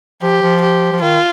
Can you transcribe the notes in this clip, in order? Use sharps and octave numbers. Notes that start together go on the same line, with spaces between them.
F3 G4
F3
G4
F3
D#3 F4